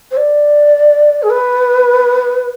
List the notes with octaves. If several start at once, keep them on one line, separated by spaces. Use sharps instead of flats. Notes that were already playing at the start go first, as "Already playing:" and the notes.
C5
D5
G#4
B4